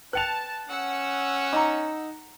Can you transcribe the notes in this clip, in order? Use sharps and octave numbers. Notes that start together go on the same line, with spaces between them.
B4 G5 A5 F#6 C#7 F7
C#4 F#5 E6
D#4 A#5 D6